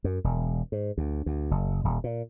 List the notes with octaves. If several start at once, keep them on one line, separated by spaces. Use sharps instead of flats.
F#2
E1
G#2
D2
D2
F#1
D#1
A#2